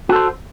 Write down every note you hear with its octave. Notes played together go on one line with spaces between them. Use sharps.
F#4 A4 C5